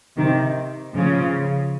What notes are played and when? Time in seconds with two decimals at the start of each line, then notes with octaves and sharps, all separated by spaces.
0.17 C3 D#3
0.93 C#3 F3